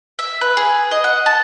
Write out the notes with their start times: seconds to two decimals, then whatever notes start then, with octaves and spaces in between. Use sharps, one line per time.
0.19 E5
0.41 B4
0.57 G#4
0.91 D#5
1.04 F#5
1.26 A5